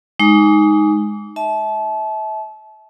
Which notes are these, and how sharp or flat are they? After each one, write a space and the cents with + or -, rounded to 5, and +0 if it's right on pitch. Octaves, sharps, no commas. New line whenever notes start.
G#3 +0 D#4 +0 D6 -30
E5 -30 A5 -30